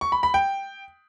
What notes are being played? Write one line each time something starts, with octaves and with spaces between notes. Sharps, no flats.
C#6
B5
B5
G5